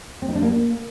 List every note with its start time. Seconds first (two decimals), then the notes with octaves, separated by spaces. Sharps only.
0.22 C4
0.29 D#4
0.35 D4
0.42 A#3